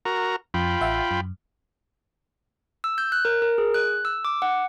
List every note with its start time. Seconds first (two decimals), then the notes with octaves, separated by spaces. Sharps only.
0.05 F#4 A#4 A#5
0.54 F2 F4 G5 B5
0.81 A1 E5 F#5
1.11 F#2
2.84 E6
2.98 G6
3.12 F#6
3.25 A#4
3.42 A#4
3.58 G#4
3.74 F#6
4.05 E6
4.25 D6
4.42 F#5